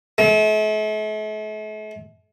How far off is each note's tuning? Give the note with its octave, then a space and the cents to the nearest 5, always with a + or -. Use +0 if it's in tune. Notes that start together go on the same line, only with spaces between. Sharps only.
A3 -45